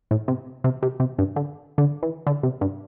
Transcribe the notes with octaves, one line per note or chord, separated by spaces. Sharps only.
A2
C3
C3
C3
C3
G2
D3
D3
E3
D3
C3
G2